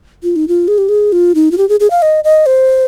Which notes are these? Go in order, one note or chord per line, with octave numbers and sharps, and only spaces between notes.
F4
D#4
F4
G#4
G4
G#4
F4
D#4
F4
G4
G#4
G#4
F5
D#5
D#5
C5